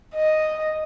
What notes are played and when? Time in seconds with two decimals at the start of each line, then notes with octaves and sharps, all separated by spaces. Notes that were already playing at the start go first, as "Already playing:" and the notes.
0.15 D#5